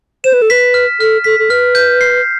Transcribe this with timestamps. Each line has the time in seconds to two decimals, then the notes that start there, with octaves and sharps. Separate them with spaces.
0.24 C5 E7
0.33 B4
0.42 A4
0.50 B4 B6
0.74 F6
1.00 A4 F6
1.24 A4 B6
1.39 A4
1.50 B4 F6
1.75 G6
2.01 C7